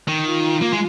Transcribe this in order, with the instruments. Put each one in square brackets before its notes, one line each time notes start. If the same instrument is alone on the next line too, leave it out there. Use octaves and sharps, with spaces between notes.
[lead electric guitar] D#3
[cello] F4
[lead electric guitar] A#3
G#3